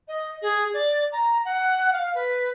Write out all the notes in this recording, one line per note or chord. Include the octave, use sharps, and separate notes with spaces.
D#5
G#4
D5
A#5
F#5
F5
B4